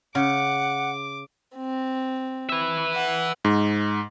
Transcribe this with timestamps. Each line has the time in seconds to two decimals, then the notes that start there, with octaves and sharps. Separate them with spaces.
0.15 C#3 F#5 D6
1.55 C4
2.49 B4 E5
2.94 F#5
3.45 G#2